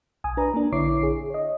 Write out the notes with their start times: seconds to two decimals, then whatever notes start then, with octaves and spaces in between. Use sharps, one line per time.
0.24 B1 G#5 D#6
0.37 D4 B4 A#5
0.54 A#3 D4
0.72 A#1 D3 E4 C#5 D6 C7
1.03 G#4
1.30 C#5 D#5